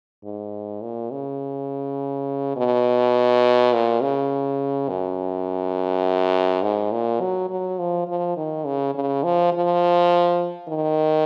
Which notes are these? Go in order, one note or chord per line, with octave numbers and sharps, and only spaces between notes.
G#2
A#2
C#3
B2
A#2
C#3
F#2
G#2
A#2
F#3
F#3
F3
F3
D#3
C#3
C#3
F3
F3
D#3